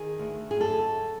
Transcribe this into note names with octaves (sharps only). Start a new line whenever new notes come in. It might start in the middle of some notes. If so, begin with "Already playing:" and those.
Already playing: D#3 G#4
D2
G#4
F#2 A4